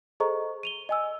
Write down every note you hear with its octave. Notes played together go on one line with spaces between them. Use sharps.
G#4 A4 C5 D#5 A#5 C#6
D#7 F7 G7
D#5 G#5 E6